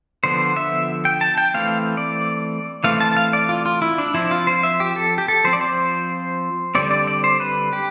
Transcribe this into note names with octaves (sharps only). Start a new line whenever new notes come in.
D3 F3 B3 C5
E5
G5
A5
G5
E3 A3 C4 F5
D5
E3 A3 C4 F5
A5
F5
D5
F4
F4
E4
D4
F3 C4 E4
F4
C5
E5
G4
A4
G4
A4
F3 C4 C5
D5
C5
D3 G3 C4 D5
D5
D5
C5
B4
G4